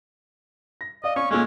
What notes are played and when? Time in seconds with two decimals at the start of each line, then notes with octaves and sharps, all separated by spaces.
0.81 A#6
1.04 D5 D#5 F5
1.16 C#4 C#6
1.31 A#2 G#3 C#4 F4 A4